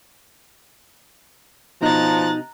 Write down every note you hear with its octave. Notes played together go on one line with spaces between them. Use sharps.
B2 F3 D#4 A#5 F#6 A6